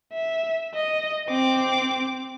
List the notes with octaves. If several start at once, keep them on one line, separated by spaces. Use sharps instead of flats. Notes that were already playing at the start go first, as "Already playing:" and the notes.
E5
D#5
C4 D6